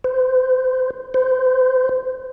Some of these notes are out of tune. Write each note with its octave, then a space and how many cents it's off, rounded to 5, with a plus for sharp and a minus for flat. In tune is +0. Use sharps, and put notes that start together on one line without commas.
C5 -30
C5 -25